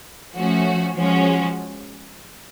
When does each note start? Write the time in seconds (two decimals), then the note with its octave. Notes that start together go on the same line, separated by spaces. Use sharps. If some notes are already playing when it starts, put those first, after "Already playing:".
0.35 F3 A3 C#4 F#4
0.95 F3 G#3 C#4 F#4